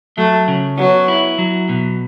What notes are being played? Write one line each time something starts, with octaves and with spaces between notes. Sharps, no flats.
F#3 A3
C#3
F#3 B3
E4
F#3
B2